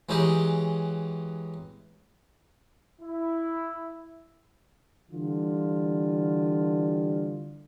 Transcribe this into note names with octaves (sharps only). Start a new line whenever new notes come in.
E3 F#3 G#3 C#4 G4 G#4
E4
D3 E3 G3 F4